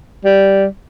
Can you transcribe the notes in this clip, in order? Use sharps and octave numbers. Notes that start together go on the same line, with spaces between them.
G3